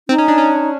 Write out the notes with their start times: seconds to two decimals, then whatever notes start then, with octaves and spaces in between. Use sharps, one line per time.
0.09 C4 D#4
0.18 C#4
0.28 D4
0.38 C#4